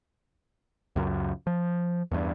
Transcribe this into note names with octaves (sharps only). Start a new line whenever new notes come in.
C#2 F#2
F3
E2 G2